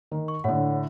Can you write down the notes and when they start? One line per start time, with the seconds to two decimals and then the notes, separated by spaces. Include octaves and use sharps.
0.12 D#3
0.28 C#6
0.44 A2 D3 C#5 F#5